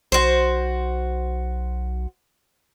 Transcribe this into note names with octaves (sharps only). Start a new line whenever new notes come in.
B1 F#4 C5